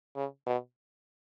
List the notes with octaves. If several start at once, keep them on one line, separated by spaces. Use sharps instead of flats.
C#3
B2